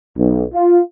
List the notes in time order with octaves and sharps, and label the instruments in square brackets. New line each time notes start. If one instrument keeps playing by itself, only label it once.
[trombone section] B1
F4